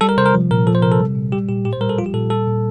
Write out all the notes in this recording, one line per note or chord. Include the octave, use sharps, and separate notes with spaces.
G3 A4
A#4
C3 C5
A#4
F3
A#2 A#4
F3 A4
C5
C3 A#4
A4
G3
A#2
G3 G4
A#2 G4
A2 G4
C5
G3 A#4
A4
F3 F4
G4
A#2 A4
G3 A4
A#2